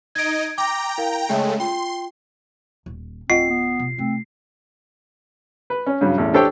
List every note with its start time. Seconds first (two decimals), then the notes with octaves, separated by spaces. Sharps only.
0.15 D#4 D#5 G#6 D7
0.58 G5 A#5 D6 A#6
0.98 E4 A#4 F5
1.29 C#3 G#3 A3 C#5 G5
1.60 F4 G5 C6
2.86 D#1
3.30 D1 C4 F4 D#5 F#5 C7
3.50 B3
3.80 C3
3.98 C3 A3 C4
5.70 B4
5.86 C#4
6.01 G2 C#3 F#3
6.18 A1 E2
6.34 D4 G4 A4 C5 C#5 G5